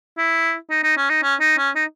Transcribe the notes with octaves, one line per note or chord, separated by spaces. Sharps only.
E4
D#4
D#4
C#4
D#4
C#4
D#4
C#4
D#4